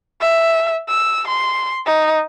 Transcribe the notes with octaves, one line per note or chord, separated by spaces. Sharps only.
E5
E6
C6
D#4